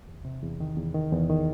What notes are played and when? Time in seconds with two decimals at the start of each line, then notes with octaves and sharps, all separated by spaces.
0.07 E2
0.25 C3
0.43 E2
0.60 D#3
0.77 E2
0.95 D#3
1.12 E2
1.30 D#3